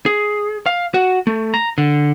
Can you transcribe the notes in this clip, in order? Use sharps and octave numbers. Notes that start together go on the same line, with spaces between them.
G#4
F5
F#4
A3
A#5
D3